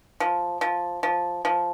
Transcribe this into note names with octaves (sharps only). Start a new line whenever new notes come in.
F3
F3
F3
F3